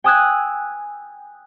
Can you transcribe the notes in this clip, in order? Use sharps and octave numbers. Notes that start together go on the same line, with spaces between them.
G5 G#5 D#6 E6 F#6 G#6